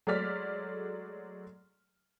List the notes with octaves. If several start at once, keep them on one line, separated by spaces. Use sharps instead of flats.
F#3 G#3 A3 D5 F6 B6